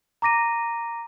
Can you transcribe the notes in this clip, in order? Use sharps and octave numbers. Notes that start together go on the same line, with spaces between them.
A#5 D6 A#6 D#7